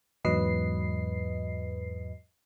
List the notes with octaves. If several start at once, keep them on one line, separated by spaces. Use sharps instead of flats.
E2 G#2 F#3 B4 D#5 C7